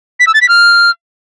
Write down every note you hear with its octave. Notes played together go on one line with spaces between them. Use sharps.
B6
E6
A6
B6
F6